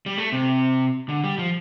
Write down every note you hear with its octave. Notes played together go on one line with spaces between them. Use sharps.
G3
A3
C3
D3
G3
F3